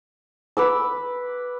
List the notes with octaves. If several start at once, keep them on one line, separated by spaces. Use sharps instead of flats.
B4 D6 E6